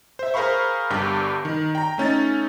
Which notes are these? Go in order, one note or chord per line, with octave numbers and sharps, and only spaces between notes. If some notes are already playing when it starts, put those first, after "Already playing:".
C5 E5
G#4 A#4 C5 F5 B5 C#6
G1 G2 G4 G6
D#3
G5 A#5
A3 C#4 D#4 A6